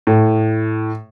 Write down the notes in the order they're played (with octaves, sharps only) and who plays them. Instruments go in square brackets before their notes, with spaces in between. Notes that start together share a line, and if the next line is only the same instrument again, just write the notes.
[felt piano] A2